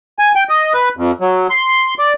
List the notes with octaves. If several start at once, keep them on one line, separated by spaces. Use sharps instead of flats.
G#5
G5
D#5
B4
F2
F#3
C6
D5